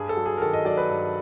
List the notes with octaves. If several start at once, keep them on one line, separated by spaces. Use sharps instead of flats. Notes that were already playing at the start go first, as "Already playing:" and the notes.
Already playing: G2 G#4
A4
F#3
G#4
A#4
D#3 A4
D#5
F#3 D5
B4
G2